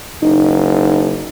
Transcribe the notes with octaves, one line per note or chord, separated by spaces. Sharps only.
F#1 D#4